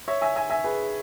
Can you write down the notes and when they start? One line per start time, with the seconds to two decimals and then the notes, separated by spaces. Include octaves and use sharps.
0.08 C#5 E5
0.22 E5 G#5
0.36 E5 G#5
0.50 E5 G#5
0.64 G#4 B4